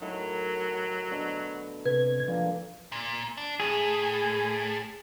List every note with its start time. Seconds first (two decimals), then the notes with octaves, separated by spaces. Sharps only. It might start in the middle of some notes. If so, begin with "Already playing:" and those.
0.01 A2 D#3 F#3
1.10 B2 D3 A3
1.86 C3 B4 G#6
2.28 A#2 D3 F3 A#3
2.92 A#2
3.37 D4
3.60 A2 G#4